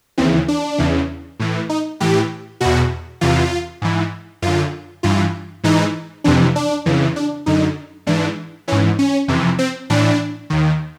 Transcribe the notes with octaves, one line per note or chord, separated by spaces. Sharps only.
D#2 C#3 E3 C4
D4
E2 C#3 E3
A2 E3
D#4
A2 E3 G4
E2 B2 F#4
E2 C3 E3 F4
G#2 E3
F#2 D3 F4
G2 E3 F4
G#2 E3 D#4
F2 C3 E3 D4
D4
F2 C#3 E3
D4
F#2 D3 D#4
G#2 E3 D4
G#2 E3 C#4
C#4
F2 C3 E3
C4
A2 E3 D4
D#2 D#3